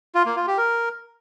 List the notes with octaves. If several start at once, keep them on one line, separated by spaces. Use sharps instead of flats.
F4
A#3
F4
G4
A#4